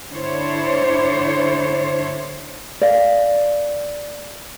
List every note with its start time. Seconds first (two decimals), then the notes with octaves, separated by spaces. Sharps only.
0.11 D3 D4 E4 C5 C#5
2.81 D5 F5